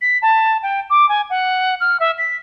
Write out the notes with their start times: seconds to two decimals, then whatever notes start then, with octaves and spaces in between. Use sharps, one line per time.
0.01 B6
0.22 A5
0.63 G5
0.90 D6
1.09 G#5
1.30 F#5
1.80 F6
2.00 E5
2.18 B6